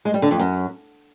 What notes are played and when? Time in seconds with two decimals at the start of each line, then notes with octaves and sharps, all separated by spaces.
0.05 G#3
0.14 G3
0.22 D3
0.31 F2
0.39 F#2